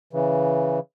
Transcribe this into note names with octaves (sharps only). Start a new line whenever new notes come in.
C#3 E3